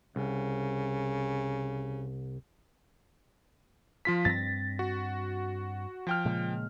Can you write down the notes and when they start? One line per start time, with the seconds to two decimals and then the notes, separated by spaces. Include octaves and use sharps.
0.16 C2 C#3
4.05 F3 F4 B6
4.25 G2 C4 A6 A#6
4.79 F#4
6.07 F3 G5 F6
6.25 A#2 C#3 G#3